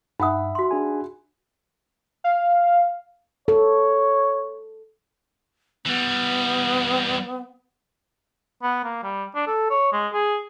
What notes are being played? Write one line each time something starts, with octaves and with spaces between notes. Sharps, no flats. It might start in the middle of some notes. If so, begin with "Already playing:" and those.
G2 D#4 E5 F#5 B5 D#6
F#4 C6
D4 G#4 G#5
F5
A4 C#5
E3 G3 B3
B3
A#3
G3
D4
A4
C#5
G#3
G#4